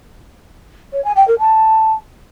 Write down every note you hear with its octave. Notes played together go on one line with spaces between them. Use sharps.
C#5
G#5
G5
A#4
A5